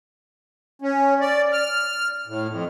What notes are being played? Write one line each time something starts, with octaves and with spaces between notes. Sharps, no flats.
C#4
D5
F6
A2
F2